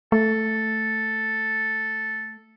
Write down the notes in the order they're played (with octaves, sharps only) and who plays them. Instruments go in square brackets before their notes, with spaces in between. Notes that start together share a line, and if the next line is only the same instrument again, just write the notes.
[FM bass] A3 [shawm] A4